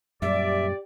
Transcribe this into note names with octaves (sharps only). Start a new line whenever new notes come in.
F#2 A#2 G3 G4 D5 E5